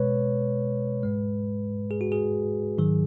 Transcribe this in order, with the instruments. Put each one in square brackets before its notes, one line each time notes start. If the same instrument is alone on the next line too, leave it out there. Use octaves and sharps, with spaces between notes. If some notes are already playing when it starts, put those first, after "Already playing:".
Already playing: [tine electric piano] B2 G#3 B4 C#5
G#2 G#3
G#4
F#4
G#4
G#2 D#3 F#3